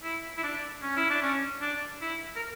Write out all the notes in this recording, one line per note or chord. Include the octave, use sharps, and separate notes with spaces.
E4
E4
D4
C#4
E4
D4
C#4
D4
E4
A#4